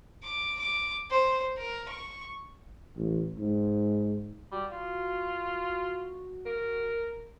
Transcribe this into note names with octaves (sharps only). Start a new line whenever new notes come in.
D6
D6
C5
A#4
C#6
A1
G#2
G3 F#4
F4
A#4